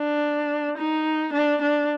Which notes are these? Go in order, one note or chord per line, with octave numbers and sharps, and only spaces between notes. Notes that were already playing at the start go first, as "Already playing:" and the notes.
Already playing: D4
D#4
D4
D4